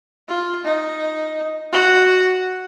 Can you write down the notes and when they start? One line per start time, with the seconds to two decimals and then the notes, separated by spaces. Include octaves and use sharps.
0.29 F4
0.65 D#4
1.72 F#4